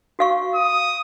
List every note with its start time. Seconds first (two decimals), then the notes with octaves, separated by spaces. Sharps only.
0.19 F#4 F5 C#6
0.55 D#6